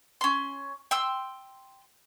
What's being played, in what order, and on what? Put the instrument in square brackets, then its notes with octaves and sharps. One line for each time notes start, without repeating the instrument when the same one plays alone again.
[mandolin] C#4 C6
G5 C6 E6